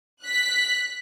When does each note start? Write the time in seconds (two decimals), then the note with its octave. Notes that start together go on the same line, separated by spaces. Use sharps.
0.23 F#6 B6